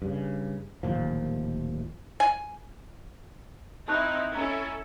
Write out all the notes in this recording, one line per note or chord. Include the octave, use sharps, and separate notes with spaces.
G2 C#3
D1 D#2 A#2 F3
G#5
C4 D#4 E4 A5 C#6 F#6
C#4 E4 A4 A#5